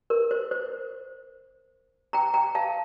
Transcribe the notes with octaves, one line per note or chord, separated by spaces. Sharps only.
A#4
C5
C5
G5 A#5
G5 A#5
F5 A5